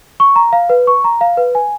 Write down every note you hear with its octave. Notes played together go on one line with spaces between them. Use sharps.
C#6
A#5
F5
B4
C#6
A#5
F5
B4
G#5